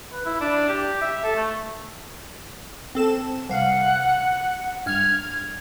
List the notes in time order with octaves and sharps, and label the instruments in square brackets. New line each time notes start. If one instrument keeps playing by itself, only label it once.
[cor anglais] B4
E4
D4
G4
E5
A4
A3
[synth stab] C4 A4 E7
[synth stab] C2 F5 [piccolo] F#5
[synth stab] G2 F6 [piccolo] G#6